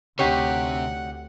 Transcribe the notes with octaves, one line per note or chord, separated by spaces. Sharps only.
D2 C3 D#4 G4 C#5 F#5